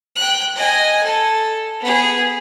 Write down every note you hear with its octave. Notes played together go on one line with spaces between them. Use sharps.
G5 F#6
D#5 G#5
A4
B3 G#4